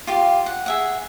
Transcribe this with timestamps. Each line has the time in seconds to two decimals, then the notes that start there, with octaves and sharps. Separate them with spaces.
0.07 F4 G4 F5
0.46 F#5
0.66 G#4 E5 F#5